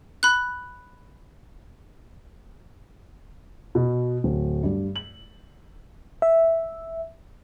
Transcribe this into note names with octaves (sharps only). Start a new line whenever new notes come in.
B5 F#6
B2
D1
G2
F#7
E5